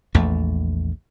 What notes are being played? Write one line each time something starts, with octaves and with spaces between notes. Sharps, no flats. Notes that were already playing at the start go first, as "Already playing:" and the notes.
A#1 E2 A3